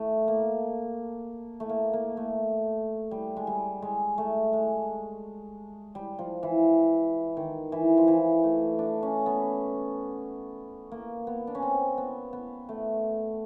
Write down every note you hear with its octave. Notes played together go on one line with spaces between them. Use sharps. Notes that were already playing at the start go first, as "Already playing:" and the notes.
Already playing: A3
A#3
A3
A#3
A#3
A3
G3
G#3
G3
G#3
A3
G#3
G3
F3
E3
D#3
E3
F3
E3
A3
D4
C#4
B3
A#3
B3
D4
C#4
C4
B3
B3
A3